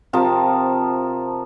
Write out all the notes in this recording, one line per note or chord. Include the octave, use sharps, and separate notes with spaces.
C3 F3 A#4 A5